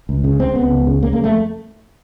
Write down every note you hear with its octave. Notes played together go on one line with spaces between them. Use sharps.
C#2
C#3
C#3 C4
C#2 B3
C#2
C#3
C#3 A#3
A#3
F2
A3